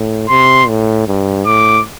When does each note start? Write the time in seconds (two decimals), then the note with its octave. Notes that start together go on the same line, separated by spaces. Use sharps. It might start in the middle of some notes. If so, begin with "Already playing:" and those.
Already playing: A2
0.29 C3 C6
0.68 A2
1.08 G2
1.46 A2 D6